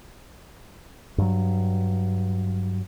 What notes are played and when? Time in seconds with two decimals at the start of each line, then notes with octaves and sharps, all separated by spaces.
1.18 G2 F#3